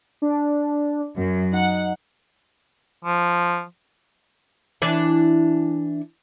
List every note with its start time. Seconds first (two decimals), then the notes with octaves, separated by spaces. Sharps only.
0.22 D4
1.17 F#2
1.52 D#4 F#5
3.05 F3
4.82 E3 D4 E5